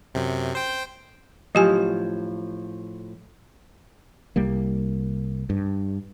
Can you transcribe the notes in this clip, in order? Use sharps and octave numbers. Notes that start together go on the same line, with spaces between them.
F#2 C3
C5 G5
A2 F3 F#3 G4 G#5
C2 G3 A#3
G2